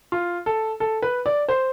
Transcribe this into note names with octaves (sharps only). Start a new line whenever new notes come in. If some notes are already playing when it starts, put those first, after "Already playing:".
F4
A4
A4
B4
D5
C5